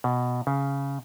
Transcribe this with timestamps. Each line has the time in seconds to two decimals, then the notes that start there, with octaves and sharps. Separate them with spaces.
0.04 B2
0.47 C#3